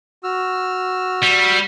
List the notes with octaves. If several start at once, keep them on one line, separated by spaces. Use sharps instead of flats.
F#4 E6 F6
G3